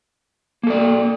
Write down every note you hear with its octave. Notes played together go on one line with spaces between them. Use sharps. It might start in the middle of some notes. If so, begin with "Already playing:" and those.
A#3 A4 D5